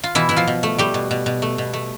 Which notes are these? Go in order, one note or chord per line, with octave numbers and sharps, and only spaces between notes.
F4
B2 E3 E4
B2 E4
F3 F4
B2
A3
G3 A3 G4
B2
B2
B2
A3
B2
A3